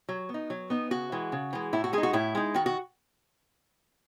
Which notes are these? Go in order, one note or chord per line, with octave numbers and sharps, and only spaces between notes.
F#3
B3
D#4
F#3
B3 D#4
C#3 F#4
E3 G#3
C#3
E3 G#3
A2 E4
F#4
G#3 D#4 G#4
F#4
A2 E4
G#3 D#4
D#3 F#4
F#4